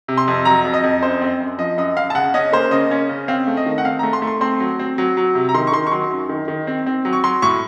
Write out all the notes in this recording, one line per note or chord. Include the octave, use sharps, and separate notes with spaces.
C3
C6
F2
F#3 A#5
F2
D#5
F2
F#2 C5
C4
F#2
F3 D#5
F#2 D#5
F#2 F5
A5
C#3 F#5
C#4 D#5
A#3 C5
C#3 D#5
C#4
C#3
C4 F5
A3
D#5
D#3
F#5
C4 F5
A3 A#5
C6
A3
C6
C4 C6
F#3
C4
F#3
F#3
C3
A#5
D#3 C6
C#6
D#3 C6
C#6
F#3 C6
F#2
D#3
D#3
C4
C4
F#3
C#6
F#3 C6
A2 C#6